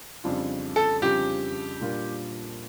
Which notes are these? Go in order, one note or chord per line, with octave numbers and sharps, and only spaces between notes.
F2 C#3 G3 D4 F4
A4
F2 C#3 G3 D4 F4 G4
A#2 G3 D4 F4 A#4